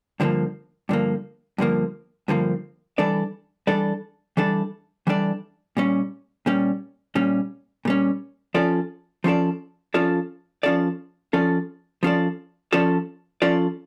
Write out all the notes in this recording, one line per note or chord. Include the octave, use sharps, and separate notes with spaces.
G2 D3 F3 A#3
G2 D3 F3 A#3
G2 D3 F3 A#3
G2 D3 F3 A#3
E3 G3 D4 A4 D5
E3 G3 D4 A4 D5
E3 G3 D4 A4 D5
E3 G3 D4 A4 D5
A#2 G3 C#4
A#2 G3 C#4
A#2 G3 C#4
A#2 G3 C#4
F3 C#4 F4 A4 D5
F3 C#4 F4 A4 D5
F3 C#4 F4 A4 D5
F3 C#4 F4 A4 D5
F3 C#4 F4 A4 D5
F3 C#4 F4 A4 D5
F3 C#4 F4 A4 D5
F3 C#4 F4 A4 D5